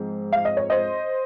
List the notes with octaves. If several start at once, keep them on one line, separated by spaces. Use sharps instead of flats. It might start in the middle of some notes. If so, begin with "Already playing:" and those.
Already playing: G#2 F3 C4
F5
D#5
C#5
C5 D#5